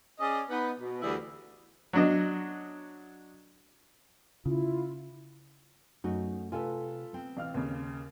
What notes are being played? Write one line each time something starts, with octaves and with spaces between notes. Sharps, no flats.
C#4 G#4 D5 D#5
B3 D#4 B4
B2
D2 E3 G3 E4 G#4 B4
F#3 D4 D#5
C#3 E4 F4
F#2 A3 D#4 F#4
C3 F4 A4 B4 G#5
B3 C4
A1 F5 F6
D#2 C#3